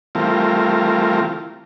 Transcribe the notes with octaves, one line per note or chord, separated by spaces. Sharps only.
E3 G3 A3 C4 F4 A#4